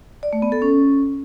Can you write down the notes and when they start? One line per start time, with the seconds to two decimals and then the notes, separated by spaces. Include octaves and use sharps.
0.23 D5
0.33 A3
0.42 B3
0.52 A4
0.62 C#4